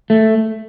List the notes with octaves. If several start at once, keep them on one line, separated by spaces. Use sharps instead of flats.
A3